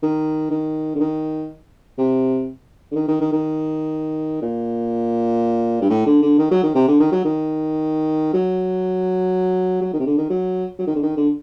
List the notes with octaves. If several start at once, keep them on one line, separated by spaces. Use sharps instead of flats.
D#3
D#3
D3
D#3
C3
D3
D#3
D#3
D#3
D#3
A#2
G2
A2
D3
D3
D#3
F#3
D#3
C3
D3
D#3
F#3
D#3
F#3
F#3
D#3
C3
D3
D#3
F#3
F#3
D#3
D3
D#3
D3